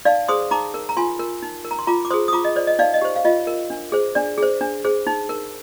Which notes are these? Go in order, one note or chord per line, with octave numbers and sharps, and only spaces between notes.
D#4 D5 F5
G#4 C5 C6 D#6
D#4 A#5 D6
A#4
A#5
F4 G#5 C6
A#4
D#4
A#4
A#5
C6
F4 A#5 D6
D6
G#4 C5 C6 D#6
D#6
F4 A#5 D6
D#5
C5 D5
D#5
D#4 D5 F5
D#5
G4 C5
F5
F4 D#5
A#4
D4
G#4 C5
D4 D5
G#4 C5
D4
G#4 C5
D#4
A#4